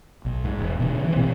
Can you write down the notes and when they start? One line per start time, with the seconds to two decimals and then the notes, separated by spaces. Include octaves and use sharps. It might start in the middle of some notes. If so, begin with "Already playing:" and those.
0.25 B1
0.44 G#2
0.59 E1
0.79 B2 D3
1.04 E3
1.16 B2 D#3 C4